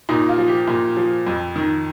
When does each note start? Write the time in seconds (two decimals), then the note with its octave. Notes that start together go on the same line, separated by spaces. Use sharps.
0.09 A#2 D#4
0.29 F4
0.38 F3
0.48 G4
0.68 A#2
0.97 F3
1.27 F2
1.56 D#3